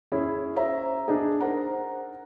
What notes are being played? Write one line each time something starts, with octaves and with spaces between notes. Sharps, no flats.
C#4 E4 G#4
C5 C#5 E5 A#5
D4 D#4 G#4
A#4 C5 F#5 A#5